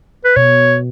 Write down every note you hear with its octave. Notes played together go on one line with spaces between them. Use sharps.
B4
B2 C#5